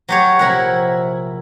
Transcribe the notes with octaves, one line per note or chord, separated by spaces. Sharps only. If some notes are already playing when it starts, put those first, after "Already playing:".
F#3 G4 C#5
A#1 C3 E4 A#4 F#5